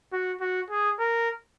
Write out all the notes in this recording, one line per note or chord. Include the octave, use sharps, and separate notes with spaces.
F#4
F#4
G#4
A#4